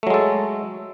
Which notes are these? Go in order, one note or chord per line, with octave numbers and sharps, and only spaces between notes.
F#3 G#3 A3 A4